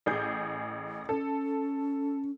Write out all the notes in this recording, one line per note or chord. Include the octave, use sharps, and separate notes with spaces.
A1 G#4 G6
C#4 A4